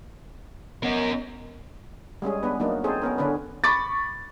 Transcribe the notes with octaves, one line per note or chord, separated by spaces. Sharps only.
B3 C#4 A#4 D#5
G3 G#3 C#4 G#4
B3 D4 B4
F#3 A#3 D4 D#4
C4 D#4 G#4 A4 C5
B3 C#4 A#4
D3 C#4 D4 B4
B5 C#6 D6 A6